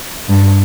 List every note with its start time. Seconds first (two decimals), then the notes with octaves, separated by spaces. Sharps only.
0.29 G2